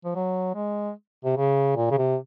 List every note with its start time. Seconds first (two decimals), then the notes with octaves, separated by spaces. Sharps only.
0.05 F3
0.15 F#3
0.55 G#3
1.25 C3
1.37 C#3
1.76 A#2
1.91 C#3
1.98 C3